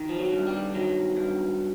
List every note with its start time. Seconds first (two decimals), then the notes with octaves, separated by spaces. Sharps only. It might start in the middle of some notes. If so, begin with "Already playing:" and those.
Already playing: D#3
0.09 F3
0.19 F#3
0.32 G2
0.47 G3
0.74 D#3 F#3
1.17 G2